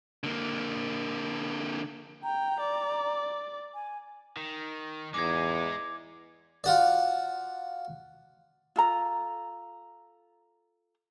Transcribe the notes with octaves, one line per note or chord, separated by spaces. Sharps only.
D3 A#3
G5 A#5
D5
G#5
D#3
E2 G#3 D#4 D6 G#6
F4 F#4 D5
F4 A4 A#5